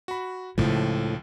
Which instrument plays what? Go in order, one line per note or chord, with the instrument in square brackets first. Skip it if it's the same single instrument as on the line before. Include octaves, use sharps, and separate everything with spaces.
[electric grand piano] F#4 B5
[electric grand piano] C#2 F3 [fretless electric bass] A2 [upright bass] C#3 D#4